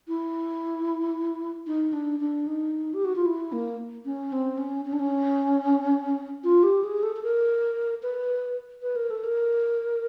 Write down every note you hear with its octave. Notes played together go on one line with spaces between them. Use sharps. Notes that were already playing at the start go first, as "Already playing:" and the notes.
E4
D#4
D4
D4
D#4
G4
F#4
F4
E4
A#3
C#4
C4
C#4
C#4
D4
C#4
F4
G4
G#4
A4
A4
A#4
B4
B4
A#4
A4
A#4